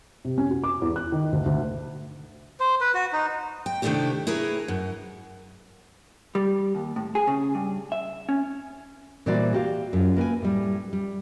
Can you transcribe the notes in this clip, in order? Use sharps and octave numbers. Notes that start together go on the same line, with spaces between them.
C3
C#4
F#4
D6
E2
F#6
D#3
D2
D2
C5
B4
F#4
D#4
G5
C3 D#3 A3 D4 E4 G4
E4 G#4 A#4 B4 C#5
F#2
G3
D#2
A2
G#4
C#3
G2
E5
C#4
A#2 E3 G3 F#4 C5 D5
F#4 G4 F5
F#2 F4
A#3 B4 G5 G#5
A2 G3
G3